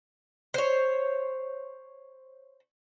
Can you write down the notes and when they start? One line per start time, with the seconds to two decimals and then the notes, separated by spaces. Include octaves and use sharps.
0.54 C5 C#5